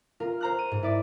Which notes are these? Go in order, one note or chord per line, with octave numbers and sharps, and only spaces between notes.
F4 A#4
C5 A#5 F#6
D#7
G#2
E4 D5